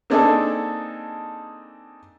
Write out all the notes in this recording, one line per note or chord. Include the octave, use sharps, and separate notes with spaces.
A#3 C4 D4 D#4 G#4 A4